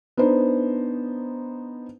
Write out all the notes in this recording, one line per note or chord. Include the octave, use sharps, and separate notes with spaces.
B3 D4 D#4 C5